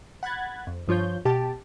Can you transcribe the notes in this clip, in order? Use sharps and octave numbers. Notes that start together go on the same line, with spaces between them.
F#5 B5 F#6 G#6 A6
F2
G2 F3 F4 C#5 G6
B2 G4 A5